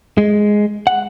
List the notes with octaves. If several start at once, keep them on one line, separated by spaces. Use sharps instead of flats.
G#3
F#5